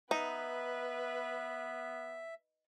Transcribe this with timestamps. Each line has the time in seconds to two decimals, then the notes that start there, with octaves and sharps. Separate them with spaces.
0.11 B3 D#4 B4 E5